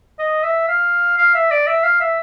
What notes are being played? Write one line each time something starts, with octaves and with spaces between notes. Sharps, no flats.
D#5
E5
F5
F5
E5
D5
E5
F5
E5